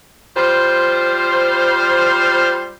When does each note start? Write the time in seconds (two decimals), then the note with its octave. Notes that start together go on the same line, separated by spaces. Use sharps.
0.36 G3 F4 C5